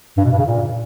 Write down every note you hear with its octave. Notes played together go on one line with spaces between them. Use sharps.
G2
B2
G2
C#3
A#2